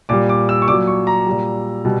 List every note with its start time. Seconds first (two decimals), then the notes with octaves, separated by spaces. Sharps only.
0.09 A#2 G3 D6
0.29 D6
0.49 E6
0.62 C#6
0.68 A#2 F#3 D6
0.87 C#6
1.07 A#5
1.27 A#2 G3
1.85 B2 G3